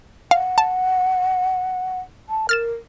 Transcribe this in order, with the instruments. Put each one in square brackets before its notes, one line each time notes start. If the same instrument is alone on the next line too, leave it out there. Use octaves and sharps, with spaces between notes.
[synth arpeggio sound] F5 [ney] F#5
[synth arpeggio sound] A5
[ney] A5
[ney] A#4 [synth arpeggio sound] F6 A6 E7